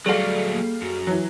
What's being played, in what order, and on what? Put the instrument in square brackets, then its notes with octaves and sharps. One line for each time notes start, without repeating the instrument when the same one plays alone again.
[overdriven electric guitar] F#3 A3 [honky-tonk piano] G3 F5 [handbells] G#4 A4 [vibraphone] D5
[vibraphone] A#3
[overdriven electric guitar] F#2 [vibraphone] F#4
[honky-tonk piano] E3 F#3